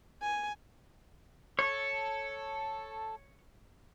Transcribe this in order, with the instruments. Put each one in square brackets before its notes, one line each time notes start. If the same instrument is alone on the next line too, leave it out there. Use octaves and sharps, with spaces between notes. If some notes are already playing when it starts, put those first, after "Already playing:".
[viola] G#5
[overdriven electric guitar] A4 [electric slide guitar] C#5